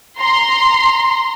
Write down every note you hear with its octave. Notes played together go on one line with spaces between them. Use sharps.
A#5 C6